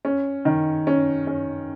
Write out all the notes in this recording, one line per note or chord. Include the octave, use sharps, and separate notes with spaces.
C#4
D#3
C#4
C#4